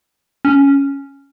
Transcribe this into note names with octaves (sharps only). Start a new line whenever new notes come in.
C#4